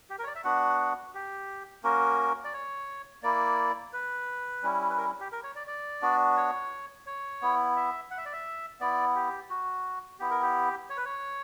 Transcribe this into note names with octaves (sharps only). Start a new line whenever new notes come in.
G4
A#4
C#5
D5
E5
B3 D4 F#4 F#5
G4
A#3 C#4 F#4 A#4
D5
C#5
A#3 E4 D5
B4
G3 C#4 E4
B4
A#4
G4
A#4
C#5
D5
D5
B3 D4 F#4
C#5
C#5
B3 E4
E5
F#5
E5
D5
E5
B3 E4 D5
G4
F#4
B3 E4 G4
A#4
G4
C#5
B4
C#5